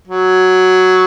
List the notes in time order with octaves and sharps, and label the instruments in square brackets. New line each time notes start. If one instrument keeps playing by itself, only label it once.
[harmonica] F#3